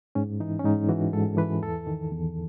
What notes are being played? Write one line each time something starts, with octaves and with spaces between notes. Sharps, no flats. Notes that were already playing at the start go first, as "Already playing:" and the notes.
G#2 C#4
E3 D#4
C#4
G#2 D#4
E3 F#4
G#2 A4
E3 B4
E2 A4
D#3
E2